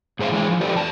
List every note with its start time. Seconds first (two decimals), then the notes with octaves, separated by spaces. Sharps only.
0.19 G#2 G#4 C5 E5 F5
0.32 E3 G#3 G#4
0.48 E3 F3
0.61 G4 A4 B4 C5 D5
0.74 E2 A5